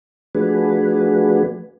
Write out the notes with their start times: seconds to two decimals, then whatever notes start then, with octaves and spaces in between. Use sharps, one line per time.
0.35 F3 A3 D4 F#4 G#4 B4